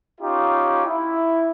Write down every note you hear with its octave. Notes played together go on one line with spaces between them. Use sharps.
C#4 D#4 F4 G4
E4